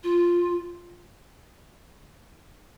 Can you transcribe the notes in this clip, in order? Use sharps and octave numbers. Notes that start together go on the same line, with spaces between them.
F4